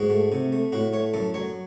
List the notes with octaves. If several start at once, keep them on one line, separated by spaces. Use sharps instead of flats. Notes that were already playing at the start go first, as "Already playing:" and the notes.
Already playing: G#2 F#4
A3
C3
A3
A2 F#4
A3 C#5
F#2 A4
F#3 C#5